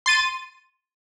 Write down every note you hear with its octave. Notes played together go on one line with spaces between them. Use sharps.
C6 A6 D#7